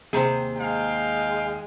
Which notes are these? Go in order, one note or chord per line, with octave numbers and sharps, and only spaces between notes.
D#2 C3 G#4 C5
G#3 F5 G5